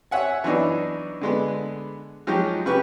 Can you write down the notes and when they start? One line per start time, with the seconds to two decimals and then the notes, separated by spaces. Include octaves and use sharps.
0.11 C#5 E5 F#5 G#5
0.44 E3 F#3 B3 D4 D#4
1.21 D3 G#3 B3
2.27 F3 F#3 G#3 D#4 G4
2.66 C#3 G4 B4 C#6